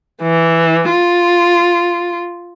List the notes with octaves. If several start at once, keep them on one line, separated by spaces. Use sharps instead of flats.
E3
F4